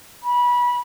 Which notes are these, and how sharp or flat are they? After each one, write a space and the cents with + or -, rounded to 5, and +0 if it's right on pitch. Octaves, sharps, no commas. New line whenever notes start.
B5 -25